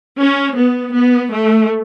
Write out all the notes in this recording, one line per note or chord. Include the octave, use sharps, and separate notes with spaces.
C#4
B3
B3
A3